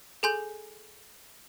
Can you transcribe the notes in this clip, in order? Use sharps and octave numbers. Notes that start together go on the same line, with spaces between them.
G#4 A4 G#5 C6 G6